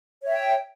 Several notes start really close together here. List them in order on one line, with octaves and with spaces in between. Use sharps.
C#5 E5 G5